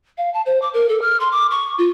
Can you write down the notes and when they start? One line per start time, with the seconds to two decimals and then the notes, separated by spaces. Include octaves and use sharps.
0.18 F5
0.34 A5
0.46 C5
0.62 D6
0.74 A#4
0.89 A4
1.02 F6
1.20 C6
1.32 D6
1.51 C#6
1.78 F4